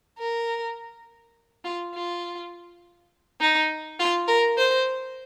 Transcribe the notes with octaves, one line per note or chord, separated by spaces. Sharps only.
A#4
F4
F4
D#4
F4
A#4
C5